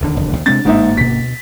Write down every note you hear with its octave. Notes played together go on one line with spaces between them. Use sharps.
E1 D#2 D3
F1
A#1 D#2 C#3
C3 G#3 C4 D4 A6
G1 G#2 A#3 D#4 E5
D2 B2 B6